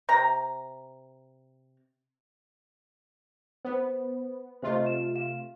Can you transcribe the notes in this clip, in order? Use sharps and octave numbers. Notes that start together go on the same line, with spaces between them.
C3 A#5
B3 C5
C3 A3 F4 C5 D#5
E5 E7
F5 E7